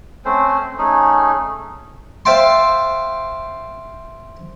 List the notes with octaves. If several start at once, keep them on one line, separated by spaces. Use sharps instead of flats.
A3 C4 C#4 C5
A3 C#4 D#4 G#4
C5 E5 F5 G5 A5 C6